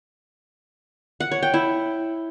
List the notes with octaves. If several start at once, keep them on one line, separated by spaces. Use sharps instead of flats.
F#5
C#5
G5
E4